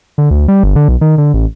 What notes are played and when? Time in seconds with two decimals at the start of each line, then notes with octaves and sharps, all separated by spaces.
0.18 D3
0.31 D2
0.48 G3
0.63 G1
0.76 D3
0.88 B1
1.01 D#3
1.18 D3
1.34 A1